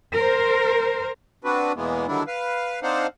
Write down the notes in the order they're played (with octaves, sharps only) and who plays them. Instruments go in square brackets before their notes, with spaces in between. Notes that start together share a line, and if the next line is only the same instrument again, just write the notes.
[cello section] A#4 C5
[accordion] B3 C4 D4 F#4 B4
E2 B2 E3 G#3 A#3 B3
D3 D#3 F#3 G3 D4 E4
B4 F5
C4 D4 D#4 C5 F5 F#5